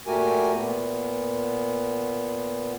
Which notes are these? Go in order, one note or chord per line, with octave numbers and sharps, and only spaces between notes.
A#2 A3 F#4 G4 A#4 G#5
A#2 B3